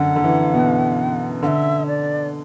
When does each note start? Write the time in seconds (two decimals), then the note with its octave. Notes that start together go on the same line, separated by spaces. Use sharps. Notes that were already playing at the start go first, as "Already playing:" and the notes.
Already playing: F#2 D3 F#5
0.16 D3
0.24 E3
0.54 B2
1.42 D3 F#5
1.47 E5
1.87 D5